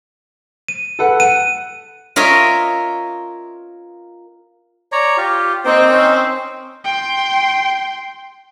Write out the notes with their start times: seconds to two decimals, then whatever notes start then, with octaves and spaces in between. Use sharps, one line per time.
0.68 D#7
0.99 A4 B4 F#5
1.20 F#5 D#7
2.16 F4 A#4 C#5 D#5 E5
4.92 C#5 D5 A#5
5.17 F4 G4
5.65 A#3 C4 D#4
5.91 C#4 D#4
6.84 G5 C6